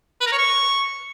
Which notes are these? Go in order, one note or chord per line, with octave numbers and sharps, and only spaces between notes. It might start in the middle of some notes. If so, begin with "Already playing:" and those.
B4
A#4
C#5
C#6